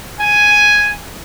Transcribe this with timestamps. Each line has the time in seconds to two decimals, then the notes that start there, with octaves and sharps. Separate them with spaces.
0.20 G#5